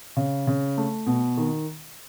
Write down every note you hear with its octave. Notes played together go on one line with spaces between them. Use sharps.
C#3
C#3
A3
B2
D#3